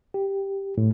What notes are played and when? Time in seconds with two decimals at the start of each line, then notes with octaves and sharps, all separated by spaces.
0.14 G4
0.78 A2